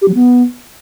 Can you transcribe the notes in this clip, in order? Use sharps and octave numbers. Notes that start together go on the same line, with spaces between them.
G4
F#3
B3